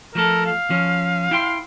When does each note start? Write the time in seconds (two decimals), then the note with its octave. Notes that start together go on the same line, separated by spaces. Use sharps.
0.15 F3 A3 A4 A#4
0.46 F5
0.70 F3 C#4
1.31 E4 G5 C6